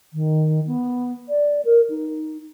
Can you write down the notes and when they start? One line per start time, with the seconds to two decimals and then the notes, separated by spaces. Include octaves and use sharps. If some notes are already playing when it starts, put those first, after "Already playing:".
0.13 D#3
0.67 B3
1.29 D5
1.65 A#4
1.90 D#4